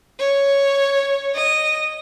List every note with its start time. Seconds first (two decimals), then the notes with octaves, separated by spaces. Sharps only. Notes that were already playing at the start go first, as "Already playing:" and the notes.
0.19 C#5
1.35 D#5